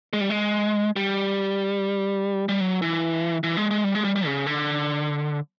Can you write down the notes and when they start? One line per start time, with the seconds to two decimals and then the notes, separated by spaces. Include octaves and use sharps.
0.13 G#3
0.21 G3
0.30 G#3
0.96 G3
2.49 G3
2.61 F#3
2.82 E3
3.43 E3
3.57 G#3
3.71 G#3
3.84 G3
3.95 G#3
4.04 G3
4.16 G3
4.26 C#3
4.46 D3